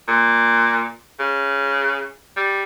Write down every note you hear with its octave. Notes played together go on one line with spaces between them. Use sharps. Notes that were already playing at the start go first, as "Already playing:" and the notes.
A#2
C#3
G3